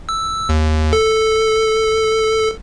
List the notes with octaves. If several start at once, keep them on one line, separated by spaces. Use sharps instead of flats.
E6
D#2
A4